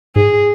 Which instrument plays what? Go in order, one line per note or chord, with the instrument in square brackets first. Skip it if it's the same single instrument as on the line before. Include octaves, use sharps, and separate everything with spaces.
[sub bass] G#2 [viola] G#4